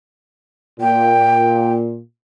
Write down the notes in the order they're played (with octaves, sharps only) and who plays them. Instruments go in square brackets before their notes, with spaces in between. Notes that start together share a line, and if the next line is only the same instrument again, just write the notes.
[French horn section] A#2 [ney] G5